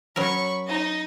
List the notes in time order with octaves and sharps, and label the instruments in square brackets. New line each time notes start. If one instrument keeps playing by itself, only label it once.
[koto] F#3 C#4 A#4 [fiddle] B5 C#6
[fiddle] D#4 D#5